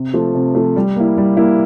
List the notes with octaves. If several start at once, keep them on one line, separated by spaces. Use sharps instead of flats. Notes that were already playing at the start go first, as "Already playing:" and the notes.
Already playing: C3
F3 A3
C3
F3 A3
G3
A#3 E4
G3
A#3 E4